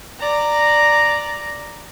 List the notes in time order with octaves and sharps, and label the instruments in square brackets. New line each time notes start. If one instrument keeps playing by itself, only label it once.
[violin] D5 A#5